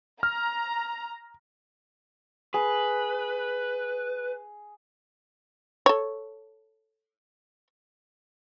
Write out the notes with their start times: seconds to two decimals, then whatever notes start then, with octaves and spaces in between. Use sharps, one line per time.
0.23 A#5 F6
2.54 G#4 B4
5.86 A4 C#5